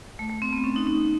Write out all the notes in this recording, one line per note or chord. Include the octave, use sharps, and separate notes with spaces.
A3
A3
C4
B3
C#4
D#4
D#4